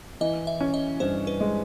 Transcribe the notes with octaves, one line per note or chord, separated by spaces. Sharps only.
E3 D#5
E5
C#4
D#5
G2 C5
B4
G#3